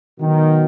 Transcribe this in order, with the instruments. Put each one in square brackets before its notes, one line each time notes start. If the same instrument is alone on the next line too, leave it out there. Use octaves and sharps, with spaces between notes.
[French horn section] B2 F#3 B3 F#4 [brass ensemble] D#3